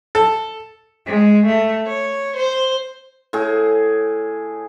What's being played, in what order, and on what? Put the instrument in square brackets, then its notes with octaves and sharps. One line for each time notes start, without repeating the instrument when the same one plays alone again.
[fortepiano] A4
[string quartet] G#3
A3
C#5
C5
[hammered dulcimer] A2 G#4